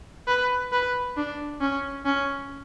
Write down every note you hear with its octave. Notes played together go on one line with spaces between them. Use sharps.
B4
B4
D4
C#4
C#4